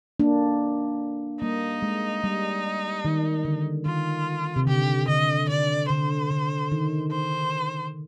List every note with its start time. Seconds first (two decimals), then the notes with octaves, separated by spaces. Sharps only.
0.20 A#3 D4
1.41 G3 A#3 D#4
1.82 G#3
2.24 G3
3.05 D#3
3.45 D3
3.86 D#3 F4
4.56 C3
4.67 D3 G4
5.08 D3 D#5
5.49 D3 D5
5.89 D3 C5
6.30 D3
6.72 D#3
7.11 C5